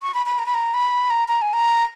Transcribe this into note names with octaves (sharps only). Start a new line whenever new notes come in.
C#6
B5
B5
A#5
B5
A#5
B5
A#5
A#5
G#5
A#5